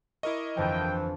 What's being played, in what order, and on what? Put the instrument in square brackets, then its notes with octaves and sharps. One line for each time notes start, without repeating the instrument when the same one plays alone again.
[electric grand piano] E4 A#4 D#5 [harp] C#6 D6
[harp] G1 F2 D4 [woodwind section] E3 F3 [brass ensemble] G5